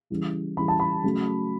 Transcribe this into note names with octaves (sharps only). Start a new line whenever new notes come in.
C#3 E3 G3
C#3 E3 G3 B5
A5
B5
C#3 F#3 A3